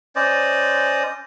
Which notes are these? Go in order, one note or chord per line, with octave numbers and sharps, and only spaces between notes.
C#4 C5 D5 D#5